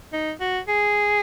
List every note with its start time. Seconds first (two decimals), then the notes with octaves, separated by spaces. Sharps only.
0.13 D#4
0.40 F#4
0.68 G#4